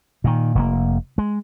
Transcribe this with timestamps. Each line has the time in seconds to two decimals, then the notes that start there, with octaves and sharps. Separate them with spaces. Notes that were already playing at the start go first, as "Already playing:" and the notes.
0.24 A#2 D#3
0.55 F1 A2 A#3
1.18 G#3